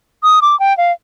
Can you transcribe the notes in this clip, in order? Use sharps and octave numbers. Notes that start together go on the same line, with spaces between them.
D#6
D6
G5
F5